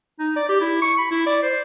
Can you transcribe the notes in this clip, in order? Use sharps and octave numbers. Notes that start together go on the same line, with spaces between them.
D#4
D5
G4
E4
C#6
B5
E4
D5
C5